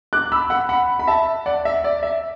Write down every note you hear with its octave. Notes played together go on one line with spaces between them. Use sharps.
D6 F#6
B5 E6
F#5 B5
F#5 B5
B5
E5 A5
D5 F#5
E5
D5
E5